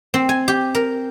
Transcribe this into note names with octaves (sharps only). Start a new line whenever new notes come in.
C4
G#5
G4
A#4